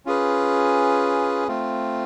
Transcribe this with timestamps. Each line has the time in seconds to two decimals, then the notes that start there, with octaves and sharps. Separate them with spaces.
0.06 C#4 F4 G#4 B4
1.48 A3 C4 F4